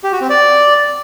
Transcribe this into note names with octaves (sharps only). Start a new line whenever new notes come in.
G4
F#4
C4
D5